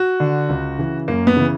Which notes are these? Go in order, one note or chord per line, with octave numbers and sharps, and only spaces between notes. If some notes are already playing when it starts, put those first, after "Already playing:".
Already playing: F#4
D3
C#2
C#3 E3
F#2 A#3
B3
C#3 E3